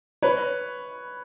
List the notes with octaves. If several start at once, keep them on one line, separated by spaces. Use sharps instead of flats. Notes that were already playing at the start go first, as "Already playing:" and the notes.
B4 C#5